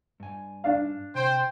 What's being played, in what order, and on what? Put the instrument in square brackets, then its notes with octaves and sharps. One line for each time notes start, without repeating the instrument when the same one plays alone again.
[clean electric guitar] G2 G#5
[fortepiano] D4 F5
[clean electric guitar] C3 [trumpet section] C5 G5